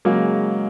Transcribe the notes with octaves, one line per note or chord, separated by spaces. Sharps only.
C#3 F#3 G#3 A#3